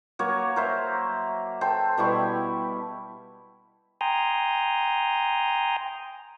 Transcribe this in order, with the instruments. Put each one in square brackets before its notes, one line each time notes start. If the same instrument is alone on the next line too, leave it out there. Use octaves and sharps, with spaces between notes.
[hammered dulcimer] F#3 A#3 C#5
A#4 C5 E5
A4 C5 G5 G#5
B2 G3 E4 C#6
[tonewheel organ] G5 G#5 A#5 C6 D#6